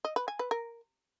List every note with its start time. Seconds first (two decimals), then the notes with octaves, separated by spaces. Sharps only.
0.05 D#5
0.16 B4
0.28 G#5
0.39 B4
0.51 A#4